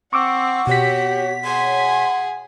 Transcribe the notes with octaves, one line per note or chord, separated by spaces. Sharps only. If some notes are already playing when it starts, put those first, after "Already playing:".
C4 F#5 C#6 D6 E6
B2 F#4 G4 C#5 B6
G#4 F#5 G#5 C6